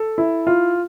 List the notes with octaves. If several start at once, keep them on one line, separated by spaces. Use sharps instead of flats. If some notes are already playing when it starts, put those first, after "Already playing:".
Already playing: A4
E4
F4